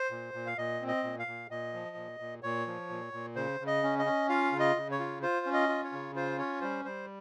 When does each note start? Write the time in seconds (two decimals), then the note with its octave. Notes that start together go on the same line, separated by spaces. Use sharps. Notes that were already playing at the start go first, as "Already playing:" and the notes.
Already playing: C5
0.11 A#2
0.34 A#2
0.46 F5
0.58 A#2 D#5
0.81 C4
0.88 D#5
1.04 A#2
1.19 F5
1.27 A#2
1.50 A#2 D#5
1.73 F3
1.96 A#2
2.20 A#2
2.43 A#2 C#5
2.67 F3
2.89 A#2
3.13 A#2
3.36 C#3 C5
3.60 C#3
3.67 D#5
3.83 C#4
3.99 D#5
4.06 C#4
4.29 F4 F5
4.52 C#3
4.60 D#5
4.76 C#3
4.91 C#5
4.99 F4
5.22 F4 C5
5.46 C#4
5.53 D#5
5.69 F4
5.84 C#5
5.92 C#3
6.16 F4 C5
6.38 C#4 C#5
6.61 G3 C5
6.85 G3 C5